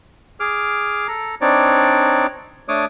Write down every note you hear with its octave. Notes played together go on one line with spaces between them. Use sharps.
G#4 D6 F6
A4 A#5
C4 D4 D#4 C#5 D5
A3 D4 C#5 D6 D#6